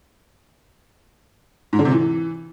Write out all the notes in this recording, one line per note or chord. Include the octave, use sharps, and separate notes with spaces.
G#2
D3
C3
E3